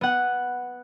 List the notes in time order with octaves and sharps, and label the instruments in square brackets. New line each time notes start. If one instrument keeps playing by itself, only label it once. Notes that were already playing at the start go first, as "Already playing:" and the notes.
[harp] B3 F#5